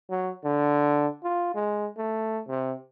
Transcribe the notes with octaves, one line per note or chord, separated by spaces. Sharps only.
F#3
D3
F4
G#3
A3
C3